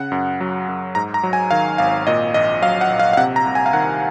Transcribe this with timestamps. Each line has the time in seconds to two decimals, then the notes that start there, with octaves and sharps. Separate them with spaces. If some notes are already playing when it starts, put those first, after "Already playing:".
Already playing: C#3 F#5
0.12 F#2
0.41 F#3
0.68 F#2
0.95 G#2 A#5
1.14 A#5
1.23 F#3
1.33 G#5
1.51 D#3 F5
1.78 G#1 F5
2.07 A#2 D#5
2.34 A#1 D#5
2.62 F#3 F5
2.81 F#5
2.90 A#1
2.99 F5
3.13 F5
3.17 C3 F#5
3.36 A#5
3.46 C2
3.55 G#5
3.66 F5
3.73 D#3 F#5